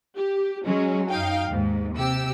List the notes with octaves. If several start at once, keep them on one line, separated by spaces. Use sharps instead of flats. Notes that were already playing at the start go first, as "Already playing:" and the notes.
G4
F#3 G#3 C#4
F#2 D#4 F5 G5
D#2 G#2
C3 G4 E6